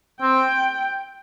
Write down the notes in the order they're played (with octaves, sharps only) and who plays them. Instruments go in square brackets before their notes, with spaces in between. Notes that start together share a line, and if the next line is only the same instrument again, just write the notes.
[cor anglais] C4 [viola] G5